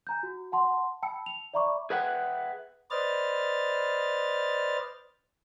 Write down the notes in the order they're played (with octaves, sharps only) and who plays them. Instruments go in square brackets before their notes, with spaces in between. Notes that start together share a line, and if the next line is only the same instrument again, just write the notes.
[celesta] G#5 A#5 G6
F#4
F#5 A5 C6
G5 A5 B5 E6 C#7
F7
D5 E5 A#5 B5 C#6 D6
[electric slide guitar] G#4 B4 E5 F#5 G5
[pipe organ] B4 C5 D5 D#5 F6 A6